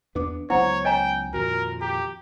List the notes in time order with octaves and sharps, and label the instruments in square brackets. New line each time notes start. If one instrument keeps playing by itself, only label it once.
[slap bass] E2 B3 D4 [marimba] B4 D6
[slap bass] C#2 F#3 B3 [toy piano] E4 [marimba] C5 F#5 A#5 [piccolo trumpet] C#5
[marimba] C#5 [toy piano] D#5 G#5 A#5 [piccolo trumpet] G5
[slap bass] F2 A#2 D#3 [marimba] F#4 [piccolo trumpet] A#4
[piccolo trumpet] G4 [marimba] A#5